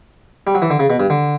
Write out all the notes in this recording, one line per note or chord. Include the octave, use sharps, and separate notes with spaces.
G3
F#3
E3
D3
C#3
B2
G2
D3